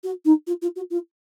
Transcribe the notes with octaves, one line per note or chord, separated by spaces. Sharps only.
F#4
D#4
F4
F4
F#4
F4